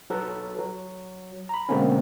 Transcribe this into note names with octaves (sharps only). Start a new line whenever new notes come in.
F#3 A4 B4
F#3
A#5 B5
B2 D3 G#3 A#3 C4 C#4